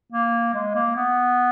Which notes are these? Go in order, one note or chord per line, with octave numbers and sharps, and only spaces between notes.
A#3
G#3
A#3
B3